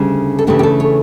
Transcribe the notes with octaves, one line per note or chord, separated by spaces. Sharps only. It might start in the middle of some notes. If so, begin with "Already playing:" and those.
Already playing: D2 C#3 G3 D4
A4
C#3 E3 A3 D4 G4
G4
A4
C#5